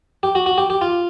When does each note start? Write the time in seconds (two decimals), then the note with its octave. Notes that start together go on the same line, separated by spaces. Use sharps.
0.23 G4
0.35 F#4
0.46 F#4
0.58 G4
0.70 G4
0.81 F4